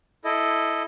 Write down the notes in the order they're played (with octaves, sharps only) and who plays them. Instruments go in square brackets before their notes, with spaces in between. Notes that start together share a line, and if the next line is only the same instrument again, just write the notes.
[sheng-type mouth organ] E4 A4 D#5